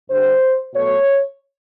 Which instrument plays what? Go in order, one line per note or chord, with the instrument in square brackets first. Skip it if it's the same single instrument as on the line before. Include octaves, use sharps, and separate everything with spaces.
[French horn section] G2 D3 G3 C5
B2 F#3 A3 C#5